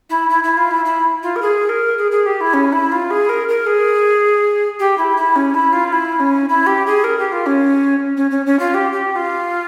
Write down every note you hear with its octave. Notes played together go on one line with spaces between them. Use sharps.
E4
E4
E4
F4
E4
E4
F4
A#4
G#4
A#4
G#4
G#4
G4
E4
C#4
E4
F4
G#4
A#4
A#4
G#4
G4
E4
E4
C#4
E4
F4
E4
C#4
E4
G4
G#4
A#4
G4
F4
C#4
C#4
C#4
C#4
F4
G4
G4
G4
F4